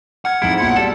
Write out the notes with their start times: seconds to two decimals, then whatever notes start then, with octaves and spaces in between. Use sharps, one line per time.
0.25 F#5 F6 G#6
0.42 F2 G#2 E4
0.60 B1 A#2 C6
0.76 B2 G3 G#3 A4